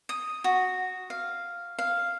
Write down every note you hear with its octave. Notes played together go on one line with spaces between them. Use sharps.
D#6
F#4
F5
F5